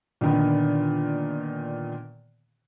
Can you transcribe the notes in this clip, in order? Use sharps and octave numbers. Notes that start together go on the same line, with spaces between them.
A#2 D3 D#3 B3